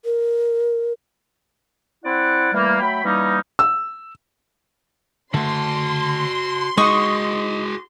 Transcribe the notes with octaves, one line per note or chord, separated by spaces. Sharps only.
A#4
C4 E4 D5 F#5
E3 G3 A3 A#3
F#3 A3 G5 B5
E3 G3 A#3 C#4 D#4
E6
D3 A3 F#4 A5 C6
G#3 D#4 F#4 G#4 F#5 C#6 D#6